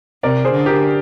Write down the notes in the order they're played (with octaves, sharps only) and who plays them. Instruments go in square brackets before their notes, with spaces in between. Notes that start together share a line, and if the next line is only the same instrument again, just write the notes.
[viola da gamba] C3 [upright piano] A#4 D5
[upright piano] G#4 C5
[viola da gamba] D3
[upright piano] G4 A#4